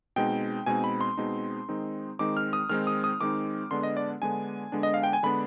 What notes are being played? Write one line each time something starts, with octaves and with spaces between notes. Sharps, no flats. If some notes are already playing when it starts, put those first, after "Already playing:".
B2 G#3 C4 D#4 G5
B2 G#3 C4 D#4 G#5
B5
C6
B2 G#3 C4 D#4
D#3 G#3 C4 D#4
D#3 G#3 C4 D#4 D6
F6
D#6
D#3 G#3 C4 D#4 F6
D#6
D#6
D#3 G#3 C4 D#4 D6
D3 G#3 B3 D4 C6
D#5
D5
D3 G#3 B3 D4 G#5
D3 G#3 B3 D4
D#5
F5
G5
G#5
D3 G#3 B3 D4 B5